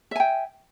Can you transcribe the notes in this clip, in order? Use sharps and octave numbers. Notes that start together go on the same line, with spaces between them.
E5 G5 G#5